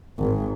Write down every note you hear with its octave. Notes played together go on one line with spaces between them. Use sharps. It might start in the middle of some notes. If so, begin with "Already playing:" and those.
G#1